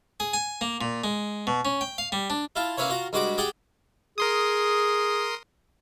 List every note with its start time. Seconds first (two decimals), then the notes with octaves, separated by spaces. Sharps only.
0.20 G#4
0.33 G#5
0.61 A#3
0.81 A#2
1.04 G#3
1.47 B2
1.65 C#4
1.81 G5
1.98 F5
2.12 G3
2.30 D4
2.56 E4 F4 A5
2.78 A#3 C#4 E4 B4 C#5
2.90 F4 F#4 A#5
3.13 G2 G#3 F#4 B5 D6
3.38 G4 G#4 F#5 G5 A5
4.18 G#4 A#4 C6 D#6